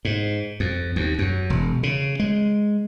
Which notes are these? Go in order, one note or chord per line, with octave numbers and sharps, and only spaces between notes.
G#2
F2
D#2
F#2
E1
C#3
G#3